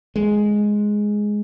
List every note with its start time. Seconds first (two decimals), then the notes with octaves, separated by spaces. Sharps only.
0.16 G#3